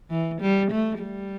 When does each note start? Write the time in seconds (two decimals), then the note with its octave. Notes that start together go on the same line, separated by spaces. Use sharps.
0.10 E3
0.41 G3
0.71 A3
1.01 G3